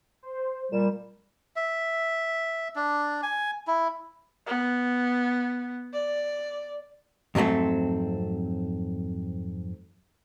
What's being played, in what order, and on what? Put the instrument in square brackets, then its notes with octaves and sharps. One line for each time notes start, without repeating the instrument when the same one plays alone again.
[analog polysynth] C5
[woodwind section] A#2 G3 [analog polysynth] E7
[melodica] E5
D4
G#5
E4
[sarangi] B3
D5
[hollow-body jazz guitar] F2 G#2 F#3 A3 C4